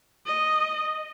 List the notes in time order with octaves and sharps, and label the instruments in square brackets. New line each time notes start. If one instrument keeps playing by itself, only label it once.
[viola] D#5